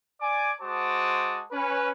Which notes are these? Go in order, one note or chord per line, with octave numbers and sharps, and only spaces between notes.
D5 G#5 D6
G#3 F#4 C5 A5 D6 D#6
C#4 B4